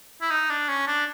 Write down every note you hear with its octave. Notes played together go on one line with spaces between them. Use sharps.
E4
D#4
D4
C#4
D4